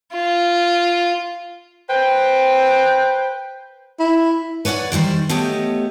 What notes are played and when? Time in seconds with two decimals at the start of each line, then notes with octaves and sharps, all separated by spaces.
0.13 F4
1.89 B4 C5 G5
4.00 E4
4.65 B4 C#5 D5 F5 F#5
4.92 D#3 E3 G3 C5
5.29 A3 B3 G4 C#5 D#5